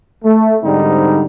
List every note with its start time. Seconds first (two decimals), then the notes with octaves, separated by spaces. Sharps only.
0.24 A3
0.63 G#2 D3 G3 C4 D#4